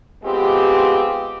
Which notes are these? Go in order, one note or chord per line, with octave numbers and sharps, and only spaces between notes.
G#3 B3 C4 F4 G4